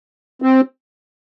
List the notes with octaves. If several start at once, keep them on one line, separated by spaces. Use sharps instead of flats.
C4